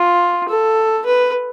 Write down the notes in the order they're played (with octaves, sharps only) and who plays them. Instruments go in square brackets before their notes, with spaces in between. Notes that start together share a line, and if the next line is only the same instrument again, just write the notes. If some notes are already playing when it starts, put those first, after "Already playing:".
Already playing: [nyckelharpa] F4
A4
B4